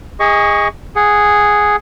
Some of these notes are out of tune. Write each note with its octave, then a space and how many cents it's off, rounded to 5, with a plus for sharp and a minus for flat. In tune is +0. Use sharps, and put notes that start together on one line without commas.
G#4 -25 D#5 +15 C#6 +15
G#4 +0 F#5 +0